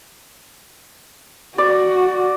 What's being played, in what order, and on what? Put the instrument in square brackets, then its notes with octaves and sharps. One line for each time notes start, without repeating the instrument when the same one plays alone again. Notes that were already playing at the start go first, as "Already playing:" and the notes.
[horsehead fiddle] F#4 [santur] D5